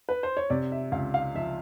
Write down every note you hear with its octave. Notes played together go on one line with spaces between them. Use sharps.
B4
C5
C#5
C3 D5
E5
C#2 F5
F5
F3 E5